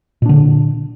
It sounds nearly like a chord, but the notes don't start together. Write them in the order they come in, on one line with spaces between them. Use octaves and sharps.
A#2 D4 D3